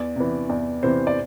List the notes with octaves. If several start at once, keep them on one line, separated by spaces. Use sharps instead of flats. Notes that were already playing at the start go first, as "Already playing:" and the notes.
Already playing: E2 D5
C3 E3
E2 D5
C3 E3 C5
D5